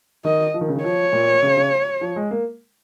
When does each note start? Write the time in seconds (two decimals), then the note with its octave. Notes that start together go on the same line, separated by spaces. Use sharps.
0.25 D#3 D#5
0.54 F3
0.61 D#3
0.69 C#3
0.75 D#3
0.83 F3 C#5
1.13 A#2
1.43 C#3
1.57 C#3
2.01 F3
2.16 G#3
2.31 A#3